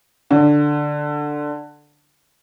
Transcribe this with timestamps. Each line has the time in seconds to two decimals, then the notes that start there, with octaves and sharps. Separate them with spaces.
0.30 D3